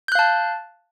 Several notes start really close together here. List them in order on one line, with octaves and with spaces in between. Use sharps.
G6 F#6 F5 A5